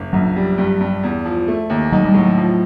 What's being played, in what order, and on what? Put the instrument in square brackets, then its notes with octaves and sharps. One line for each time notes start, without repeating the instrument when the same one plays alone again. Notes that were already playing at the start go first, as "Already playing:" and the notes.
Already playing: [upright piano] F#1
[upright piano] A#1 [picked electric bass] F#3
[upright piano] G3
G2
G2
E2
F3
A3
D#2
[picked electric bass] F#3 [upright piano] D#4
[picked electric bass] G3
[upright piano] A2 [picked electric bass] F#3
[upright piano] F3